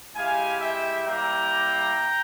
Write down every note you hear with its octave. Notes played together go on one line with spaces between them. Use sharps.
G#3 E4 G4 F5 G#5
E5 G5
G3 A#3 E4 G4 G5 A#5